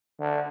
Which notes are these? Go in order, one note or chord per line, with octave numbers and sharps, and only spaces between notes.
D3